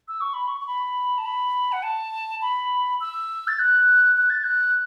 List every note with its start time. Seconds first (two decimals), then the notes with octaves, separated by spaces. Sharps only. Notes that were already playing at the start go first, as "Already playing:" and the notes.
0.08 E6
0.21 C#6
0.34 B5
0.48 C#6
0.60 C#6
0.67 B5
1.18 A5
1.26 B5
1.72 F#5
1.83 A5
2.42 B5
3.01 E6
3.48 A6
3.59 F#6
4.17 F#6
4.30 A6
4.44 F#6